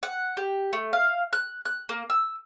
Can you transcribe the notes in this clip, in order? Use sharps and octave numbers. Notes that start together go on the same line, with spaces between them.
F#5
G4
A3
F5
F#6
F#6
A#3
E6